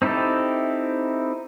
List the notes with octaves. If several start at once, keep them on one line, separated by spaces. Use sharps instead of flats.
C4 D#4 E4 G4 A4